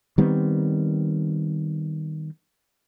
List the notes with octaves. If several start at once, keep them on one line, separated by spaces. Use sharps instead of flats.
D#3 G3 B3 C4